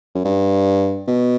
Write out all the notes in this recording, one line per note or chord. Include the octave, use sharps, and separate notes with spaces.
F#2
G2
B2